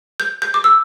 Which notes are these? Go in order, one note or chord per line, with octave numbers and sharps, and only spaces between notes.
G6
G6
D6
E6